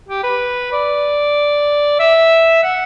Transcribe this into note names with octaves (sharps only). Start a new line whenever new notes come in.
G4
B4
D5
E5
F#5